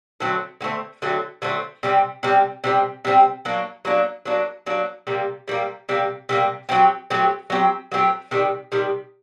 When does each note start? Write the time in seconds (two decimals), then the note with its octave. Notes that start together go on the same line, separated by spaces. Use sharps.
0.20 D3 F#3 A3 C4
0.61 D3 F#3 A3 C4
1.02 D3 F#3 A3 C4
1.42 D3 F#3 A3 C4
1.83 C3 G3 C4
2.23 C3 G3 C4
2.64 C3 G3 C4
3.05 C3 G3 C4
3.45 F#3 A#3 D4
3.85 F#3 A#3 D4
4.25 F#3 A#3 D4
4.66 F#3 A#3 D4
5.07 C3 G3 A#3
5.48 C3 G3 A#3
5.89 C3 G3 A#3
6.29 C3 G3 A#3
6.69 F#3 A3 C4 G4
7.10 F#3 A3 C4 G4
7.50 F#3 A3 C4 G4
7.92 F#3 A3 C4 G4
8.31 C3 D#3 G3
8.72 C3 D#3 G3